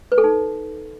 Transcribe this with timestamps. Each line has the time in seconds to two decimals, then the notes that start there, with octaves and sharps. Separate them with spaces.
0.12 B4
0.18 A4
0.24 D#4